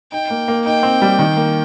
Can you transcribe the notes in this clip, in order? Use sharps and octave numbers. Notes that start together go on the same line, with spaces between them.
D#4 G5
A#3
A#3
D#4 G5
C4
G3
D#3
A#3